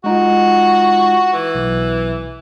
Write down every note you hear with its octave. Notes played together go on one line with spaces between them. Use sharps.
G#3 D#4 F4 F#4
E3
B1